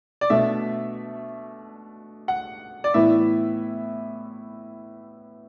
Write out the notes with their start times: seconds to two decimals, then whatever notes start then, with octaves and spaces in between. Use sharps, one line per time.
0.21 D5
0.30 B2 A3 D4 E5
2.28 F#5
2.84 D5
2.94 A2 E3 B3 E4 E5